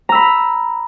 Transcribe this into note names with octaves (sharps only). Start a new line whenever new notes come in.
A#5 B5 E6